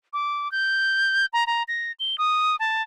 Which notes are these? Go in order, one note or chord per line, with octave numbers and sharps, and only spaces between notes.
D6
G6
A#5
A#5
A#6
G7
D#6
A5